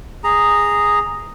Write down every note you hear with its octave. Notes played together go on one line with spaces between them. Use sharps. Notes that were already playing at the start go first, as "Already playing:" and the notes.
G#4 A#5